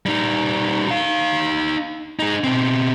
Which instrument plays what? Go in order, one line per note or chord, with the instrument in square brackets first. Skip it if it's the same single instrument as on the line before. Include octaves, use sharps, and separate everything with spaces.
[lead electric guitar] G3 D#4
D#4 F5
D#4 G#4
B2 C4